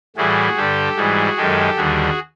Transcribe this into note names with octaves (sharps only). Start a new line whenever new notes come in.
A2 E3 G3 F#4 G#4
G2 D3 G3 G4 A4
G#2 E3 G3 F#4 G#4
F#2 D#3 G#3 G4 A4
D#2 D3 G3 F#4 G#4